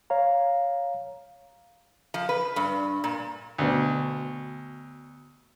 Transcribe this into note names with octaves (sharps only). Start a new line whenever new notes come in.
C#5 F5 A#5
F3
B4
G2
A#2
D2 B2